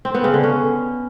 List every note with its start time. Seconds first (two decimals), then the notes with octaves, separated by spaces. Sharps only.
0.05 C4
0.15 B3
0.24 C#3
0.34 D3
0.43 C#4